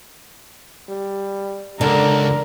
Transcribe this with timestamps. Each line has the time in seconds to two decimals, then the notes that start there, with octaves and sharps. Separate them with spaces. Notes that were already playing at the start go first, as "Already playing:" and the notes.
0.89 G3
1.81 C#2 D3 D4 A#4